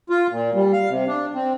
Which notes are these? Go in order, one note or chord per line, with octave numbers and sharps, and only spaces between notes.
F4
A#2
G3
F5
C3
D4
C4